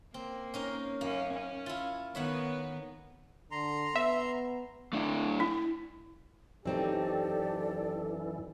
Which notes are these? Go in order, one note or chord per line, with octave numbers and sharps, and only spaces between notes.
A#3 C4
C#4 D#4 A#4
F#2 A#3 C#4
C#4
E4 F4
D#3 B3 C#5 E5 F#5
D3 A#5 C6
B3 E5
A3 D4 E4
E4
F#2 E3 F#3 C4 D#4 G4 A4 D5